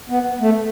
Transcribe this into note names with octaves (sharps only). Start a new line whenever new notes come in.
B3
A3